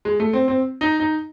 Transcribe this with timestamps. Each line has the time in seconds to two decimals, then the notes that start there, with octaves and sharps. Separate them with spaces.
0.05 G#3
0.20 A3
0.33 C4
0.48 C4
0.81 D#4
1.00 D#4